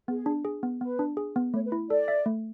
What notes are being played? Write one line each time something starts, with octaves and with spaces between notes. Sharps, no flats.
B3 G#4
D4
G#4
B3
B3 B4
D4
G#4
B3
A3 C#5
B4
E4
A4 D5
E5
A3